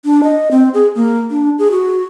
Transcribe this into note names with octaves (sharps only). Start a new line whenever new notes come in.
D4
D#5
C4
G#4
A#3
D4
G#4
F#4